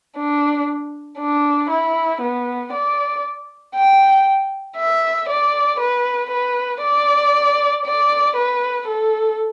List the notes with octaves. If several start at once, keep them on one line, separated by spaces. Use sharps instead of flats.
D4
D4
E4
B3
D5
G5
E5
D5
B4
B4
D5
D5
B4
A4